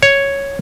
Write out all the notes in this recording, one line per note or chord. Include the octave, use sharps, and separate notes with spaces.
C#5